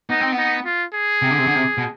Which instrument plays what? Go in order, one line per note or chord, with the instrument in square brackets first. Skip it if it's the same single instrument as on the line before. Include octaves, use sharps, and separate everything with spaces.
[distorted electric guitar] B3 [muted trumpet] D#4
[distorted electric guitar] C4
B3
[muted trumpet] D#4
F4
G#4
[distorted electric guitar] C3
D3
C3
D3
C3
B2